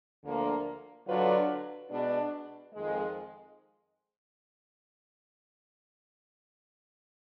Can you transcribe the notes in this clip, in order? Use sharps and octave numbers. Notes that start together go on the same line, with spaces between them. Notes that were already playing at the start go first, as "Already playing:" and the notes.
D2 D3 F3 A#3
D3 F#3 D4 F4 B4
B2 G#3 D4
F2 D#3 G#3